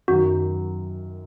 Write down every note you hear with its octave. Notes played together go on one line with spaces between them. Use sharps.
F#2 D#3 F#3 F#4